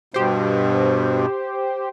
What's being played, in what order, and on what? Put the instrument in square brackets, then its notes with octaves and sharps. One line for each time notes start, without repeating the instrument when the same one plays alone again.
[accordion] G2 B2 [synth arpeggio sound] G4 C5